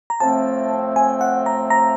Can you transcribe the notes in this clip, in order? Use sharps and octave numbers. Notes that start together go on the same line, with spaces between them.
A#5
A2 F3 A3 C4 A5
G#5
F#5
A#5
A#5